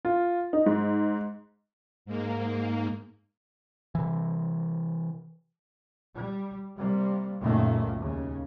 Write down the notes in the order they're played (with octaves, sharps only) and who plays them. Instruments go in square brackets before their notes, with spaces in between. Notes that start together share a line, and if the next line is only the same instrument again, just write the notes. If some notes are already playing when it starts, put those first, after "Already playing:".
[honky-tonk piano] F4
D#4
G#2
[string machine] G#2 A#3
[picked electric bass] C3 E3
[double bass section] G3
C3 G3 A#3
C#2 F#2 A#2 D#3 A3 A#3
D#2 C#3